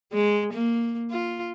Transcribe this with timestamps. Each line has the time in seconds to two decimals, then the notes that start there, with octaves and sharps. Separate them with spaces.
0.13 G#3
0.53 A#3
1.11 F4